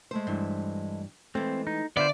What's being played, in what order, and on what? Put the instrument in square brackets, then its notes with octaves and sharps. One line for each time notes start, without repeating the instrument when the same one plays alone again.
[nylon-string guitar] G#3 A3 C5
[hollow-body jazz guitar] G2 E3
[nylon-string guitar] E3 G#3 [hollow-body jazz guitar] A3 [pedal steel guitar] C4
[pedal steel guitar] D#4
[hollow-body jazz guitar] D3 [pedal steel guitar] B3 F4 C5 [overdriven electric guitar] D5 [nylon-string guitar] E5